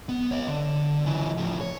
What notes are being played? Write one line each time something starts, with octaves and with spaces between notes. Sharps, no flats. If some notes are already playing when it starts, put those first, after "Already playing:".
B3
C#5 D#5
D3
C#3 E3
A2 F3
C#5